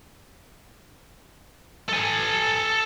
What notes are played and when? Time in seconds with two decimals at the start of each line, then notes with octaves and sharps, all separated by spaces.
1.89 A4 G#5